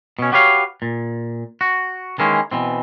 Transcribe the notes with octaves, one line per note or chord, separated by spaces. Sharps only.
B2 C#4
F#4 G4 B4 C#5 F5
A#2
F#4
D#3 E3 G#3 A#3 C#4
B2 E3 C4